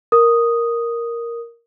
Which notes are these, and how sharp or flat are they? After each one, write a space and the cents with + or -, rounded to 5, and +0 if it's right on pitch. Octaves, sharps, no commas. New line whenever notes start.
A#4 +0 D#6 +0